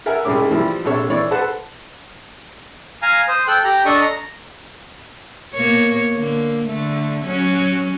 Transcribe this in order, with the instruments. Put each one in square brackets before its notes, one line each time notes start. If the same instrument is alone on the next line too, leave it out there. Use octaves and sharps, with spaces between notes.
[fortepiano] A4 A#4 E5 F#5 G#5
C2 G#2 G3 C4 C#4 D6
E3 F3 G3 E4
A#1 C3 A4 C#5
E3 C#5 D5
A4 B4 C5 F#5 A5
[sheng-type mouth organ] F5 G#5 A#5
C5 D#6
A4 G5 F#6
G4 G5 A#5
D4 A4 D#5 C#6 D#6
A#5
[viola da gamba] B2 A#3 C#5
D3 A#3
D3 A3
F#3 C#4